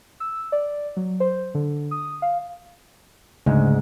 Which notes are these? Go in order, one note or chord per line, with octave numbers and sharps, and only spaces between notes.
E6
D5
F#3
C5
D3
D#6
F5
D2 G#2 C#3 G#3